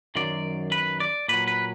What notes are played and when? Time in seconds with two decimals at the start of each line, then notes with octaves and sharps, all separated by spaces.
0.15 F#2 D#3 F#3 D5
0.72 B4
1.00 D5
1.28 A#2 F#3 B4
1.48 B4